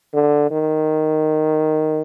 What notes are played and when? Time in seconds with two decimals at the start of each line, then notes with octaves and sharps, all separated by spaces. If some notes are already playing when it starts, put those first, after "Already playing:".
0.13 D3
0.50 D#3